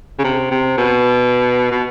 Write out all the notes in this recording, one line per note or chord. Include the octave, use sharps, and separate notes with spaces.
C#3
C3
C3
B2
B2